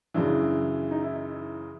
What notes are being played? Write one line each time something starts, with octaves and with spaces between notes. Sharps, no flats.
F#2 C#3 E3 D4
D#4
E4